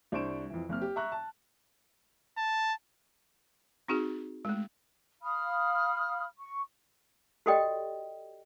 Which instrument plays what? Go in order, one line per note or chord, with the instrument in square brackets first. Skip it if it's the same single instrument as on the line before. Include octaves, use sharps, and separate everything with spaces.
[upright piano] C2 D4 C5 C#6 D7 E7
F2 E3
F#1 C4 F6
G4
E5 A#5 C#6 F#6
A5
[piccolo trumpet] A5
[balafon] C4 D#4 F#4 G#4
G#3 A3
[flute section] F5 B5 D#6 F6
C#6
[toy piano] F#4 G4 A4 D5 D#5 G5